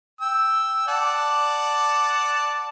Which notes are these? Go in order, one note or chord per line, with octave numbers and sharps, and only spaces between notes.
G5 E6
D5 F#5 A5